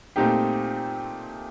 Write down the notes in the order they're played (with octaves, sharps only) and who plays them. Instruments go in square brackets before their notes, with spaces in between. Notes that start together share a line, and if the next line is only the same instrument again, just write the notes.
[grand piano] A#2 A3 C4 D#4 G4